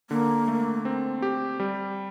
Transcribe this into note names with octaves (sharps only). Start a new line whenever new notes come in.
D3 A#3
A3
C4
G4
G3